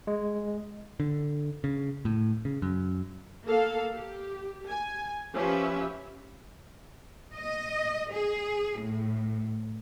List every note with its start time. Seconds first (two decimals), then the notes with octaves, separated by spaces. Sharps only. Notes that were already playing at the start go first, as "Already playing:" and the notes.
0.07 G#3
1.00 D3
1.64 C#3
2.05 A2
2.45 C#3
2.62 F#2
3.46 A#3 A4 F5
3.95 G4
4.69 G#5
5.33 F3 C#4 G4 B4 E5
7.34 D#5
8.13 G#4
8.81 A2